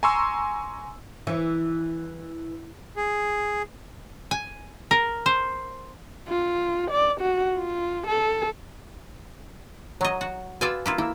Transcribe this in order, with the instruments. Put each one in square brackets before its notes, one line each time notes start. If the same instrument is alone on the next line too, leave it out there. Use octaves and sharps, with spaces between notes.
[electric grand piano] G#5 A#5 C6 C#6 E6
[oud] E3
[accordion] G#4
[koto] G#5
A#4
C5
[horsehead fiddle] F4
D5
F#4
F4
A4
[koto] F#3 D#5 [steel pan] C#5 A#5 C#6
[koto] F#4
[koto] F4 D5 G#5 [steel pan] F#4 B4 E6
[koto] A#3 E4 F4
[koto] A#3 [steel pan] E4 E6